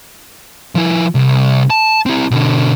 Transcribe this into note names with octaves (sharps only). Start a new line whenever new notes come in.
F3 E4
C2
A5
C4 E4
B2 D3